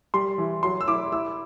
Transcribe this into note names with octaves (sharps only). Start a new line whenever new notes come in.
G3 C6
E3
F#3 C6
E6
E4 D6
E4 E6